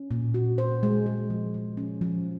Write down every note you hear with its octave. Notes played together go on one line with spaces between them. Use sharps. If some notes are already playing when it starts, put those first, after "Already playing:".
Already playing: C#4
A#2
F#4
C5
G#3
G#3
F3
F3
C#4
F3